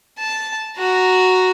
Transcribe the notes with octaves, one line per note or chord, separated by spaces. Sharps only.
A5
F#4 A#5